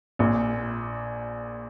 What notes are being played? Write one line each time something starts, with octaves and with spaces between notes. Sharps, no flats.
A#1 A#2